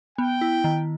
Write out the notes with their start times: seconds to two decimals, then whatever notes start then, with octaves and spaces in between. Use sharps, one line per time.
0.18 B3 G5
0.41 E4
0.64 D#3